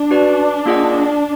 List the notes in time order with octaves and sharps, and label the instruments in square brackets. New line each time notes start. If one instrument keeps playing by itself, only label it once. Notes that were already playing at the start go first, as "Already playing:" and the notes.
Already playing: [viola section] D4
[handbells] F#4 B4 D5
A#3 F4 G#4 D#5 F#5